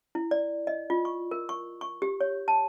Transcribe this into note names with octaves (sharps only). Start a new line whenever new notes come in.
E4
D5
D#5
F4
C#6
A#4
C#6
C#6
G4
C#5
A5